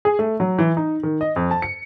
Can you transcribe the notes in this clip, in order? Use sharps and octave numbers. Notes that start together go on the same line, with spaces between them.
G#4
A3
F#3
E3
D#4
D#3
D#5
F2
A5
C#7